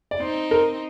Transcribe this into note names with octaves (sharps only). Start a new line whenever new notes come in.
D5
C4 D#4 C5
A#4